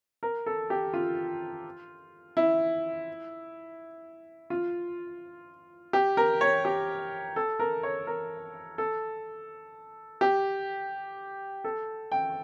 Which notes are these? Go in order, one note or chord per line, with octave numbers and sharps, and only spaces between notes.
A#4
A4
G4
F4
E4
F4
G4
A#4
C#5
G4
A4
A#4
C#5
A#4
A4
G4
A4
G5